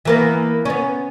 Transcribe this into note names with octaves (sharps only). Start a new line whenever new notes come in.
E3 A#3 B3
B3 C#4